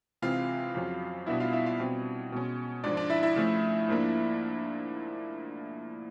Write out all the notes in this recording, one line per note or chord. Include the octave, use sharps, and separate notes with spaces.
C3 E3 G#3 C4 F4 F5
F2 C#3 F#3
B2 G3 B3 D4 E4 E5
F4 F5
E4 E5
F4 F5
B2 G3 C4
B2 G#3 C#4
G#2 F3 G#3 D4 D5
D4 D5
E4 E5
E4 E5
C#3 F3 A3
G#2 F3 A#3 D4